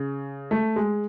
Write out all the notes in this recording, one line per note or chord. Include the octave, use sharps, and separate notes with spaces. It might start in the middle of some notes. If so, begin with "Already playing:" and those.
Already playing: C#3
A3
G#3